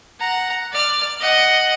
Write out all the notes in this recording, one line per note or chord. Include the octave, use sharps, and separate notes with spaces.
F#5 A#5
D5 F6
D#5 F#5